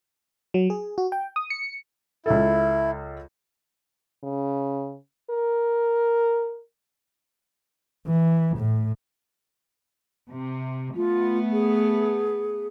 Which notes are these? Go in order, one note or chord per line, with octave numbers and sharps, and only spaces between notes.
F#3
G#4
F#4
G5
D#6
C#7
C#2 E4 A4
C#3
A#4
E3
A2
C3
A3 B3 F4
G#4